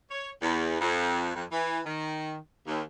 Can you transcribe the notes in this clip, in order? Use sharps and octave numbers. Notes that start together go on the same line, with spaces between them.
C#5
E2
F2
F2
E3
D#3
D#2